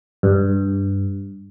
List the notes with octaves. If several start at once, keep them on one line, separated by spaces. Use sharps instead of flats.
G2